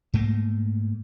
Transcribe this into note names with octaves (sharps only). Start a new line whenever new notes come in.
G#2 A3 A#3